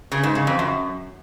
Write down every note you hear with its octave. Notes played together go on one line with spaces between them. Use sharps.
C#3
G#2
C#3
F2
F#2